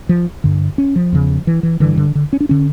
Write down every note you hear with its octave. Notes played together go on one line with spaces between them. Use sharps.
F3
G2 D3
C#4
F3
E2 C#3
E3
E3
G2 D3 E3
D3
D3
C#4
D4
D3 C#4